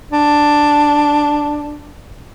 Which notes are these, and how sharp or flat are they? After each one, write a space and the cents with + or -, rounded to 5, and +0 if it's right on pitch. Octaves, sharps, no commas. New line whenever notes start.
D4 +5